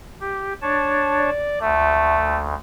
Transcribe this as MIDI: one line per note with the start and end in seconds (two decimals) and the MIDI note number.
0.21 0.53 67
0.62 1.30 62
0.62 1.30 73
0.62 1.30 81
1.17 1.57 74
1.61 2.54 38
1.61 2.45 57